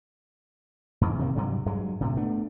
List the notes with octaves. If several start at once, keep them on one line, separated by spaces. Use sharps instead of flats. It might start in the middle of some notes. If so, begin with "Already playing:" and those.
F2 G#2 E3
C3 D#3 G3 A#3
G2 C3 F#3 G3
G2 F#3 G#3
D2 A2 C3
A3 B3 D4